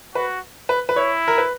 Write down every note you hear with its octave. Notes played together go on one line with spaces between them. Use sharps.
F#4 B4
B4
B4
E4 C#5
A#4
B4